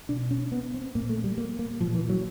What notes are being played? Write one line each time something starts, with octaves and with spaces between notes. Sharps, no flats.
B2 D4
C#4
B3
C4
A#2 A#3
A3
G3
A#3
A#3
A#2 F3
E3
F#3